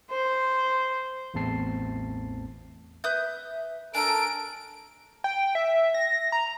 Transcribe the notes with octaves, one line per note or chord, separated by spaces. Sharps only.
C5
A1 E2 A3 C4 A5 C7
B4 E5 D#6 G6
D4 A4 A#4 G#5 A5 D7
G5
E5
A#6
A#5